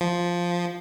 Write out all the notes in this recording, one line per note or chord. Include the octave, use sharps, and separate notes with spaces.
F3